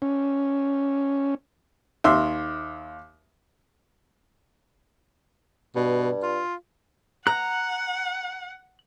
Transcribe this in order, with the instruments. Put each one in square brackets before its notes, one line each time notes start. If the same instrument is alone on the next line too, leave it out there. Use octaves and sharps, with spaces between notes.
[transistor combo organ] C#4
[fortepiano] D#2 E5 C6
[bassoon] G2 [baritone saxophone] B2
[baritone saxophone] F4
[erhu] F#5 [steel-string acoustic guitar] A#5 [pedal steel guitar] F#6